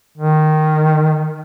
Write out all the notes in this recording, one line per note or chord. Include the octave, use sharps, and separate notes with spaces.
D#3